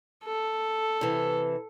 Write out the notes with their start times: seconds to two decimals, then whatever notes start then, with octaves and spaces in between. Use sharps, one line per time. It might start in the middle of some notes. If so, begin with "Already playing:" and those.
0.24 A4
1.01 C3 E3